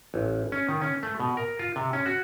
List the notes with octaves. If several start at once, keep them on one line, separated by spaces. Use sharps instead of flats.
A1
C#4
D#3
C#4
A3
B2
A#4
F4
C3
C#4
F#4